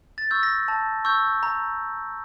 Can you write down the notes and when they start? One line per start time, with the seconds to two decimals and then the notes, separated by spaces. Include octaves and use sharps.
0.18 A6
0.31 C#6 E6 G6
0.43 A#6
0.68 A5
1.05 C#6 E6 G6
1.43 A#5